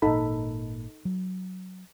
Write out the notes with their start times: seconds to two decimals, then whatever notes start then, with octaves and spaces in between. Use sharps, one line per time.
0.02 G#1 A#2 D#4 A4 B5
1.05 F#3